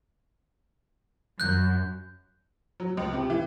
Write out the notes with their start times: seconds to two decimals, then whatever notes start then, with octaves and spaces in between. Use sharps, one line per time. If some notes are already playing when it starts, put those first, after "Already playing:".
1.40 F#2 F#6 G6
2.80 F#3
2.97 C#2
3.13 C3
3.30 E3